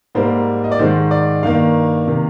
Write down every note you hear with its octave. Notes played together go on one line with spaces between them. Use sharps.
G#2 G3 A#3 C5
D#5
D5
G#2 D#3 G#3 C5
D5
G2 D#3 A#3 F5
C3 D#3 A#3